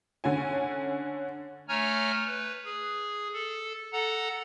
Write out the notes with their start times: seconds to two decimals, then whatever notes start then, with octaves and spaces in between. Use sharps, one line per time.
0.24 D3 C#4 G#5
1.69 A3 C#5 G#5 A#5 F6
2.26 B4
2.65 G#4
3.34 A4
3.92 A4 F#5 A#5